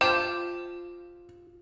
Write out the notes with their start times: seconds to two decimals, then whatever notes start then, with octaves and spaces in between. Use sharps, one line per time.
0.01 F4 G4 C5 A5 E7